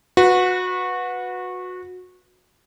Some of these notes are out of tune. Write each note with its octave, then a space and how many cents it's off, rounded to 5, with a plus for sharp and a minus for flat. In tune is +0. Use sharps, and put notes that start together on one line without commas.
F#4 -20 B4 +0